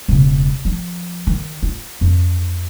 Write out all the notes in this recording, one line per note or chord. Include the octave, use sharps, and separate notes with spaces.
E1 C#3
F3
D#3
F4
F2